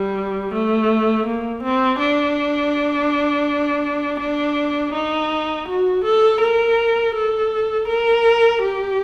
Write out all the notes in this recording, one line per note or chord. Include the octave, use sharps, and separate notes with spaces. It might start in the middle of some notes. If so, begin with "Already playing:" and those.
Already playing: G3
A3
A#3
C4
D4
D4
D#4
F#4
A4
A#4
A4
A#4
G4